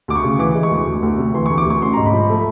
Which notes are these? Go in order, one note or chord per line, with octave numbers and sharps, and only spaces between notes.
D2 D6
C#6
C#3
E3 D6
G#3
C#6
D2
D2
D2
C3
E3 C6
D2 C#6
D6
D2 C#6
C#4 C6
G#2 A#5
B5
F3
A3